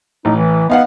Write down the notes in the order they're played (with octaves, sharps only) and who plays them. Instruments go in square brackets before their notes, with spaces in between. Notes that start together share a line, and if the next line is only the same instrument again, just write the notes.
[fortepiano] A1 [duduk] D#4
[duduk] E3
[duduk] B3 [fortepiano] D#4 F5 F#5